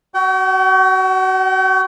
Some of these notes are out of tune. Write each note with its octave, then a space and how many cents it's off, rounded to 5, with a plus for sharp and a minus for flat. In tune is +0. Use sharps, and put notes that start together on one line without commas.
F#4 +25 G5 -40